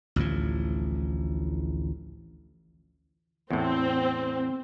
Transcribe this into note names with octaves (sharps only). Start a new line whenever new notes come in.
A1 D2 A2 F3
E2 A2 C4